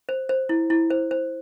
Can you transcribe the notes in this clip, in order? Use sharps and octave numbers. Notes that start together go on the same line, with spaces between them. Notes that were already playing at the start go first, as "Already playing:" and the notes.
C5
C5
E4
E4
C5
C5